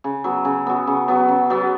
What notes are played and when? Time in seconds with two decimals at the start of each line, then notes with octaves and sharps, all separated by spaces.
0.04 C#3
0.24 F#3 B3
0.45 C#3
0.67 F#3 B3
0.87 C#3
1.08 F#3 B3
1.29 C#3
1.50 F#3 B3